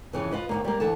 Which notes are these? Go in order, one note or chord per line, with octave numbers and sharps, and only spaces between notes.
F2 C#3 E3
F4 B4 D#5
D2 D#3 A#3
G3 A#3
D2 E3 A4 A5